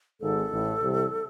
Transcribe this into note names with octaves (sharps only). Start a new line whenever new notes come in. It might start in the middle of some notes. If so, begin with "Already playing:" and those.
G#1 G#2 A4
A1 A2
C2 C3